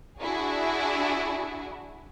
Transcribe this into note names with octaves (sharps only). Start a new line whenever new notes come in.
D4 E4 F#4 G#4